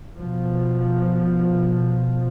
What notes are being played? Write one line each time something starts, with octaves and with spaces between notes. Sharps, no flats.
B2 F3